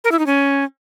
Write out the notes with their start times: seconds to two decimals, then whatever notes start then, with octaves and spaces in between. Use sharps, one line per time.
0.04 A#4
0.12 E4
0.19 D#4
0.26 C#4